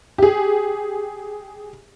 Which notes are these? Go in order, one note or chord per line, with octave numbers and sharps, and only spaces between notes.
G4 G#4